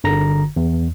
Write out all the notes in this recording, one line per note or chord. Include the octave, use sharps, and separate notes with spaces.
G1 D3 A#5 A#6
E2